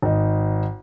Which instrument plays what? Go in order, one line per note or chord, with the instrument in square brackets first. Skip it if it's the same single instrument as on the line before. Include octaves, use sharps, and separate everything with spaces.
[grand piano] G#1 D#4